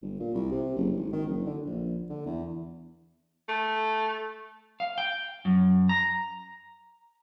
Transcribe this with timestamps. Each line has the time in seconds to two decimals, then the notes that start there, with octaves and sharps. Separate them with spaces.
0.02 G1
0.20 A#2
0.34 C2
0.51 C3
0.76 F#1
0.96 G#1
1.13 D#3
1.26 F#1
1.45 D3
1.65 A#1
2.10 D3
2.26 E2
3.49 A3
4.80 F5
4.98 G5
5.45 F#2
5.89 A#5